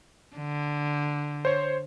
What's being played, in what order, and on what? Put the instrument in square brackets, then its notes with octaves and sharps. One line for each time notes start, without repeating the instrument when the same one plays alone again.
[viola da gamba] D3
[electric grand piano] C5 C#5